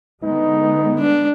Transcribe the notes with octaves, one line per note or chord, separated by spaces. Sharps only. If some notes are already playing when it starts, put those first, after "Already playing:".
D3 G#3 B3 D#4
D4